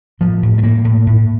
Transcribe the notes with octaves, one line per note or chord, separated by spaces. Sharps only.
A2 F3
A2
A3
A2 A#3
A2
A2